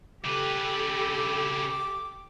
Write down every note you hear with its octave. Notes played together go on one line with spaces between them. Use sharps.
C#3 G4 A4 B4 D6